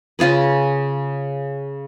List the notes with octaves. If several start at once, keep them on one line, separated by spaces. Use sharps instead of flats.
C#3 F4 G#4 B4